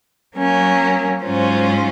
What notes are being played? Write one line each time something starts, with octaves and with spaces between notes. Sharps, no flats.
F#3 A#3 C#4
G#2 F#3 C#4 F4 C5